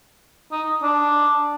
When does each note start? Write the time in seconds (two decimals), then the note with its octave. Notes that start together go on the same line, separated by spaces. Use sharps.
0.52 D#4
0.83 D4